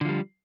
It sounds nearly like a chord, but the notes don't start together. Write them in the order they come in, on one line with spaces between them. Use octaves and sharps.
D3 F3 G3